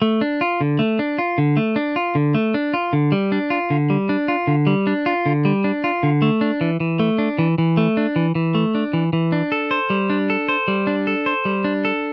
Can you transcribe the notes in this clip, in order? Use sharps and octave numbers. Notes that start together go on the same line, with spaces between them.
A3
D4
F4
D3
A3
D4
F4
D3
A3
D4
F4
D3
A3
D4
F4
D3
G3
D4
F4
D3
G3
D4
F4
D3
G3
D4
F4
D3
G3
D4
F4
D3
A3
D4
E3
E3
A3
D4
E3
E3
A3
D4
E3
E3
A3
D4
E3
E3
D4
A4
C5
G3
D4
A4
C5
G3
D4
A4
C5
G3
D4
A4